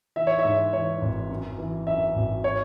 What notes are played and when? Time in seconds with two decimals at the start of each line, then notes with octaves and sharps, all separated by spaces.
0.16 E3 E5
0.27 C#5
0.39 E5
0.45 G#2
0.73 E3 C#5
1.02 G#1
1.30 F#2
1.58 E3
1.87 F#2 E5
2.16 G#1
2.44 C#5